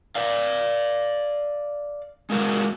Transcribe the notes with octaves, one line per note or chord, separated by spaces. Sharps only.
D5 F5
G#3 A#3 F#4